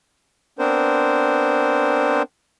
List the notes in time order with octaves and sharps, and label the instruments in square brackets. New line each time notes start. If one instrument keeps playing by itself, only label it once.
[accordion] B3 C4 D4 A#4 C5